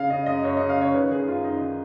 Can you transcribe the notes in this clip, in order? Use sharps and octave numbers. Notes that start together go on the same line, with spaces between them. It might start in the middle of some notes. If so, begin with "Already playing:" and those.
Already playing: C#3 F5
C#3 D#5
F#2 D#5
F#2 C#5
C#3 D#5
F5
C#3 C#5
D#3 B4
D#3 G#4
F#2 F4
F#2 D#4
D#3